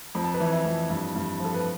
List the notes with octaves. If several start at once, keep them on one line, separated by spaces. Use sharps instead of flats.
F2 B5
A5
B4 B5
E3
E4 E5
F2
G2
G2
F3 A4
B4